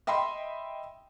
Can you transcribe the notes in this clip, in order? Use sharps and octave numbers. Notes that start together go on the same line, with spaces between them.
D#5 E5 G5 B5 C6